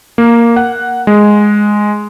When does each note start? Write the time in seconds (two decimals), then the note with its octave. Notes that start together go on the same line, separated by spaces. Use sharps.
0.18 A#3
0.56 F#5
1.07 G#3